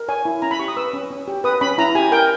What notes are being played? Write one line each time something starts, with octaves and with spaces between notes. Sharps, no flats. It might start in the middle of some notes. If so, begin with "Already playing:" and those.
Already playing: A#4
C#5 G#5
E4
C#4 A#5
B5
G4 C#6
D#6
B4 E6
C#4
C#4
G4
B4 D#6
C#4 B5
E4 A#5
G4 G#5
A#4 G5